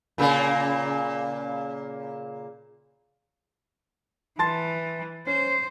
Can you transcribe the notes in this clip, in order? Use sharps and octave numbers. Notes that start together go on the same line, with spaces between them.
A#2 C#3 A#3
E3 A5 C6 A6
C#4 C5